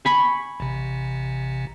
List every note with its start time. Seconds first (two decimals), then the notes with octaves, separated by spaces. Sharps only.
0.05 G#5 B5 C#6
0.60 A1 C3